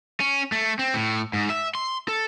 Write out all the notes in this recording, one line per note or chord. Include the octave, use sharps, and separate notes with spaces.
C#4
A3
C4
A2
G#2
E5
C6
A4